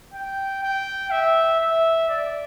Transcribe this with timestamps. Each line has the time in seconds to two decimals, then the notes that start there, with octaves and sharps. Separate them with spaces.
0.14 G5
0.63 G5
1.11 E5
1.60 E5
2.09 D5